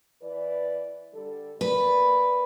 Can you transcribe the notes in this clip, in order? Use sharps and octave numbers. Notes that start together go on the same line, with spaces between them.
E3 B4 D5
D3 G3 A4
A#3 B4 D5